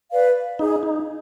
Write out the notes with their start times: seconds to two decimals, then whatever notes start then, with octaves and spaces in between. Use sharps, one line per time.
0.12 B4 D5 F5
0.59 D#4 G#4
0.83 D#4